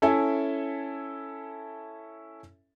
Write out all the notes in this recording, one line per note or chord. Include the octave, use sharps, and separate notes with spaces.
C#4 E4 A4 E5 G#5